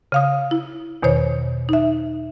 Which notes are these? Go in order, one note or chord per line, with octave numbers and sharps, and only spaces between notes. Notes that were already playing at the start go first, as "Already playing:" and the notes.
C#3 F5 D#6
E4
E2 B2 D#3 C5 C#5
D#4 E5